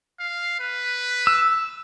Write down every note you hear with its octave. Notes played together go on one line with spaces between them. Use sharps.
F5
B4
E6